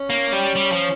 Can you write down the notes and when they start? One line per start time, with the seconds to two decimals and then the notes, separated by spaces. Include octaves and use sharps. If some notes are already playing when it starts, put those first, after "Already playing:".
Already playing: C#4
0.10 A#3
0.32 G3
0.55 G3
0.72 F3